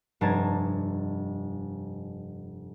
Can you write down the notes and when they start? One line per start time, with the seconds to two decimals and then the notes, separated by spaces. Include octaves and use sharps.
0.21 F1 G2 D4 A5 A#5 G#6